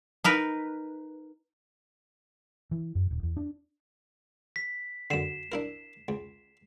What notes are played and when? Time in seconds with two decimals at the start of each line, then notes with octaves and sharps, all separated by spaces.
0.24 D#4 A#4 B4
2.71 E3
2.95 F#2
3.11 D#1
3.23 E2
3.37 D4
4.56 B6
5.10 F#2 D3 C7 E7
5.52 D4 E4 A#4
6.08 C#2